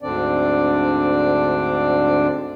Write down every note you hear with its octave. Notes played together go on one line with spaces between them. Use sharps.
D2 G#2 D3 C4 D4 D5